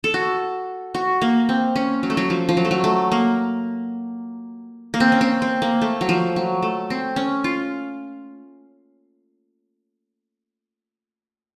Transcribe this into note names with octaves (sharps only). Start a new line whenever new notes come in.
A4
F#4
F#4
A#3
C4
C#4
F#3
A3
F#3
F3
F3
F#3
A3
F#3
A3
A#3
A#3
C4
C#4
C4
C4
A#3
A3
F#3
F3
F#3
A3
C4
C#4
F4